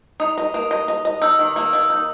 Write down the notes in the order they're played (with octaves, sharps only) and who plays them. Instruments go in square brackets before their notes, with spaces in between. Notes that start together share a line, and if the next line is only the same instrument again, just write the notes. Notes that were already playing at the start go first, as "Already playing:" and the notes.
[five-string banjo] D#4 [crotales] D#6
[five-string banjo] D#5
A#3
D#5
D#5
D#5
[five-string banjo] D#4 [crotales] E6
[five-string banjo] D#3
A#3
D#3
D#4